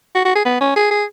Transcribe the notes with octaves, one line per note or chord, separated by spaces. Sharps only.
F#4
F#4
G#4
B3
C#4
G#4
G#4